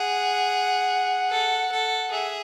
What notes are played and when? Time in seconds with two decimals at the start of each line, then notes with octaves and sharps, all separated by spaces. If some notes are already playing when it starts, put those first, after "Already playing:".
Already playing: G#4 F#5
1.30 A4
1.71 A4
2.11 G#4 E5